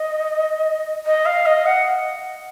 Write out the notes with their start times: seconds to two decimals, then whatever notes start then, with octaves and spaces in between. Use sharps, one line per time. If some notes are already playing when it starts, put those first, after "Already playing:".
Already playing: D#5
1.05 D#5
1.25 F5
1.45 D#5
1.65 F#5